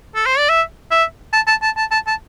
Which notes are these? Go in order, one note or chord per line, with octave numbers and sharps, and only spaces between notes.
A4
C5
D5
E5
E5
A5
A5
A5
A5
A5
A5